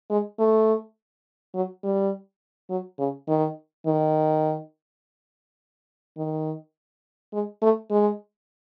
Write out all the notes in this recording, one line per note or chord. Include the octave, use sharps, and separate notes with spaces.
G#3
A3
F#3
G3
F#3
C#3
D#3
D#3
D#3
G#3
A3
G#3